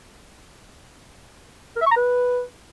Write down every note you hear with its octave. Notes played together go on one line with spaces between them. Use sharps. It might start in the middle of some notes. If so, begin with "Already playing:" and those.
A#4
E5
C#6
A#5
B4